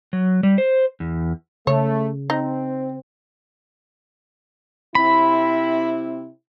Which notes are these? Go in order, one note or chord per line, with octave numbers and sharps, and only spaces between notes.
F#3
G3
C5
E2
C#3 A3 C#5
C4 D#4
C3 C4 E4 B5